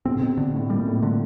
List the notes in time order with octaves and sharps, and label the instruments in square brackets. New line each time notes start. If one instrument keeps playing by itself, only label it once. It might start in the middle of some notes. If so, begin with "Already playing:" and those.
[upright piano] B2 [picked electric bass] C4
[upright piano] C3
B2
[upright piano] B2 [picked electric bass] D3
[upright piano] A2
[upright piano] A#2 [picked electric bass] G3
[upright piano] A2
[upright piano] A2 [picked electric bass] D3